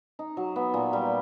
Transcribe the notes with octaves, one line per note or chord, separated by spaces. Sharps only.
D#4
F#3
B3
A#2
G3